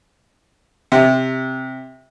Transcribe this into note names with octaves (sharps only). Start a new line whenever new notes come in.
C3